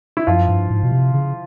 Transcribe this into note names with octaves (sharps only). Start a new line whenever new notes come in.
E4
F#2 F3 F4
G2
G#2
B2
C3
C#3